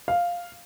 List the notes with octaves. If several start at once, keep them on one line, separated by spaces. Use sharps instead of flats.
F5